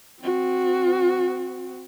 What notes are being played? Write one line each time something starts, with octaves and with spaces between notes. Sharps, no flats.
C4 F#4